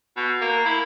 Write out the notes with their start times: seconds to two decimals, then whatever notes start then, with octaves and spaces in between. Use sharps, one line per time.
0.16 B2
0.41 A#3
0.65 E4